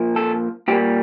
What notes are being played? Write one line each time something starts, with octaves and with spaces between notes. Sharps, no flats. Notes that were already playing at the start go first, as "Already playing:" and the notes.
Already playing: A#2 F3 A#3
A4
A#2 G3 A#3 G4